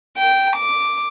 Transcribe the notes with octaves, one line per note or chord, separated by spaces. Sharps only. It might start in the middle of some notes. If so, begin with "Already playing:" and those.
G5
D6